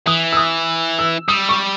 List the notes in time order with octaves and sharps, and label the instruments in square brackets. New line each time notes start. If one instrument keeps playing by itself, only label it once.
[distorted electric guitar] E3 [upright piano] D#6
[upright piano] E6
D#6
E6
[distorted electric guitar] G3 [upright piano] D#6
[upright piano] C#6